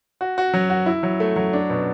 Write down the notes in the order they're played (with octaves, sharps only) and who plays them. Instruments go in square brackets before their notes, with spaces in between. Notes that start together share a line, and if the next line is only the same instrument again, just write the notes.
[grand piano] F#4
F#4
F#3
F#4
E4
F#3
A3
F#3
D4
B2